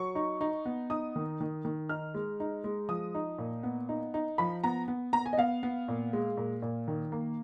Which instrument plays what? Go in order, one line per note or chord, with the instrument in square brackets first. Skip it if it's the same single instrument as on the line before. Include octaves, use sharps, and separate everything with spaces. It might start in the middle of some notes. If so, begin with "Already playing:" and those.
Already playing: [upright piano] F#3 C#6
D#4
D#4
B3
D#4 D#6
D#3
D#3
D#3
D#4 F6
G#3
D#4
G#3
F3 D#6
D#4
A#2
B3
D#4
D#4
F3 B5
B3 A#5
B3
B3 A#5
G#5
D#5
B3 F5
B3
A#2
G#3
A#2
A#2
D#3
A#3